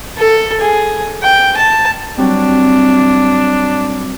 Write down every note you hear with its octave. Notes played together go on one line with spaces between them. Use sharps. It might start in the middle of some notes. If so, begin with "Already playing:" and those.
A4
G#4
G5
A5
F#3 G3 C4 D4